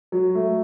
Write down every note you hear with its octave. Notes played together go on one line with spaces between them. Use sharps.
F#3
A3